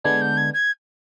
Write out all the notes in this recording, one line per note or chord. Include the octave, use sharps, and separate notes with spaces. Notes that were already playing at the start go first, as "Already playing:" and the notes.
D3 G#3 B3 D4 G#6
G6
G#6
G#6